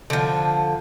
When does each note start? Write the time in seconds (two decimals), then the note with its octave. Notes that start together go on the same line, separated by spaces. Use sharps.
0.10 D3 F3